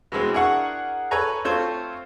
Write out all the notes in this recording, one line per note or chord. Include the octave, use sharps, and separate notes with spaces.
B2 E3 G#3 C4
D4 E4 G#4 A#4 F#5 C#6
A4 B4 C#5 G#5 A#5
A3 C4 F4 A4 C5 C#5